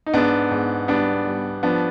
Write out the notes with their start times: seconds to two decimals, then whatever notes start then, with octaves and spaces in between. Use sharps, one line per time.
0.06 D#4
0.13 G#2 B3 D4
0.51 G#2
0.88 G3 B3 D4
1.26 G3
1.63 F3 B3 D4